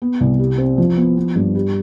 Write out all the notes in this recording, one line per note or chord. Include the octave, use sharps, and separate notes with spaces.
B3
C2
G3
C4
F3
B3
B3
G2
G3